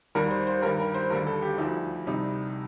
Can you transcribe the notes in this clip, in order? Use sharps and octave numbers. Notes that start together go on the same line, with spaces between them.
D#2 D#3 G3 A#4
C5
C5
G2 D#3 G3 A#4
A#4
C5
D#2 D3 G3 A#4
A4
G4
D2 D3 F3 D#4
C2 C3 G3 D#4